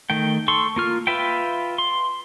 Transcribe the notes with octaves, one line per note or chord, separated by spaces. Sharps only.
D#3 A3 G5
A4 C6 C#6
A#3 F4 F6
F4 B4 E5 G5
C6